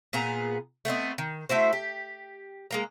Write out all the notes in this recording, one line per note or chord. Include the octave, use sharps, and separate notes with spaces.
A#2 B3 G#4 A#5
A3 B3 C4 D#5
D#3
A3 E4 F#4 C5
G4
G#3 A#3 A#5